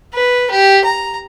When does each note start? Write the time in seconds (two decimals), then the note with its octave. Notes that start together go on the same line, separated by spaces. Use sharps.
0.14 B4
0.51 G4
0.85 A#5